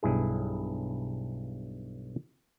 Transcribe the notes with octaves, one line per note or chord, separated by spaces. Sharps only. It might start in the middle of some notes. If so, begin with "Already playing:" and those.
B1 G2 E4 G#4